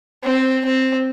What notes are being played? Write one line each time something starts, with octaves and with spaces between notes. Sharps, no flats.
C4
C4